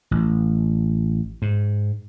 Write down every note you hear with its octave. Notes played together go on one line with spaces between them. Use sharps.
A1
G#2